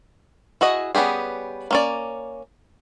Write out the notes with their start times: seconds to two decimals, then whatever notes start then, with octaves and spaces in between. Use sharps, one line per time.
0.61 E4 F#4 G#4 D#5
0.95 G3 B3 C#4 G4 G#4
1.71 A#3 C#4 D5